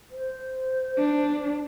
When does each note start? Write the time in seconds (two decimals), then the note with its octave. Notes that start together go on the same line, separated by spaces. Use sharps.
0.11 C5
0.98 D4